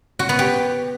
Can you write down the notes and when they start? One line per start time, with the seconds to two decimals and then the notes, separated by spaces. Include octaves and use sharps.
0.19 F#4
0.29 B3
0.39 G4